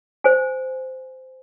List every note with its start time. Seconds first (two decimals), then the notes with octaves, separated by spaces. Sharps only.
0.24 C5 G#5